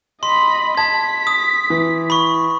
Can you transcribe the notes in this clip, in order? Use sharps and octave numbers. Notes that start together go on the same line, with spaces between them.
D#5 B5 C6
A5 G#6 B6
D#6
E3
B5 C#6